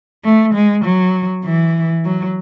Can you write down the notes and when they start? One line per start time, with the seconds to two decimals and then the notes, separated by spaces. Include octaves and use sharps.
0.24 A3
0.55 G#3
0.85 F#3
1.44 E3
2.04 F#3